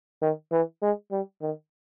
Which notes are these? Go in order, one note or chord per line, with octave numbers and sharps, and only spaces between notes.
D#3
E3
G#3
G3
D#3